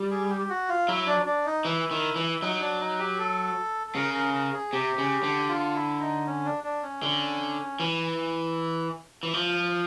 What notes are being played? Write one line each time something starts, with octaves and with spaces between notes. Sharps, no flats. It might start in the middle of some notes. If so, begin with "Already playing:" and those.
Already playing: G3
G#4
G4
F#4
F4
F#3 E4
D4
D4
D#4
E3 E4
D#3
E3
F#3 D#4
D4
D#4
G4
A4
A4
C#3 A#4
A#4
A#4
G#4
C3 G4
C#3
D3
F4
E4
D#4
C#4
D4
D4
C#4
D3
E3
E3
F3